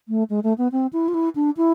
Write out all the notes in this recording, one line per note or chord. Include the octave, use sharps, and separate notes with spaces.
A3
G#3
A3
B3
C4
E4
F4
E4
D4
E4